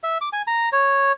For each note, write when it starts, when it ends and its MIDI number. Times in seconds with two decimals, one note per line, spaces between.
0.04 0.18 76
0.21 0.29 86
0.33 0.42 80
0.47 0.69 82
0.72 1.12 73